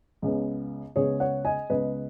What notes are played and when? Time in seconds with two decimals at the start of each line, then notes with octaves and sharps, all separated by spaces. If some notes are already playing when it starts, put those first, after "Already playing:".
0.22 C#2 C#3 B3
0.96 C#2 C#3 B3 G#4 C#5
1.20 C#5 F#5
1.45 D#5 G#5
1.70 C#2 C#3 B3 B4 D#5